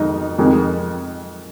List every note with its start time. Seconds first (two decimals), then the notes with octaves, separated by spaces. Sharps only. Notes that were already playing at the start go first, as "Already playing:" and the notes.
Already playing: F2 D#3 G#3 D#4
0.38 F2 D#3 G#3